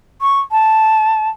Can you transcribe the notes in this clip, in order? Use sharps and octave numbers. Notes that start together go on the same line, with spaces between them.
C#6
A5